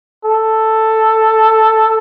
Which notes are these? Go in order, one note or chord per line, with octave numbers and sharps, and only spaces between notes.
A4